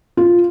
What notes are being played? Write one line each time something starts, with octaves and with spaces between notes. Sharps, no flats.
F4